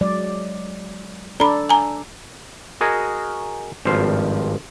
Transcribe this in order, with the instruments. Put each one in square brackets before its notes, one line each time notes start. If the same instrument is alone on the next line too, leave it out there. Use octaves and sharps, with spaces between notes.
[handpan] F#3 G#3 D5
[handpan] D4 A4 D5 [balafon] A#5 B5
[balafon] G#5 A#5
[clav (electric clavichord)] F#4 G#4 A#4 D#5 G#5
G#1 G2 F3 C5 F5